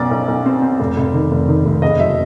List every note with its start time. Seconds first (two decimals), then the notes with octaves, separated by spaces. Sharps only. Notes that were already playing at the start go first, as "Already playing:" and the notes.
Already playing: B1 F#2 B2 D5
0.11 B1
0.28 B1
0.46 C4
0.62 C4
0.80 F1
0.97 F1
1.14 D#3
1.31 F1
1.48 D#3
1.65 F1
1.82 F#1 D#5
2.00 F#3 E5